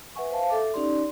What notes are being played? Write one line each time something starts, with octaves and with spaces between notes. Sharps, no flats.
B4 E5 F#5 G#5 C#6
C5 F5 A5
A4 E5 D6
C#4 D#4 G4 D5 C6